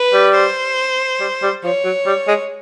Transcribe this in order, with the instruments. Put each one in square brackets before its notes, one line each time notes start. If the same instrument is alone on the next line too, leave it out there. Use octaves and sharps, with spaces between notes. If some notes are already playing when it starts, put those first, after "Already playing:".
Already playing: [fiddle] B4
[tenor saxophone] G3
[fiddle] C5
[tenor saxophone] G3
G3
[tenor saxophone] F3 [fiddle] C#5
[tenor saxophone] F#3
G3
G#3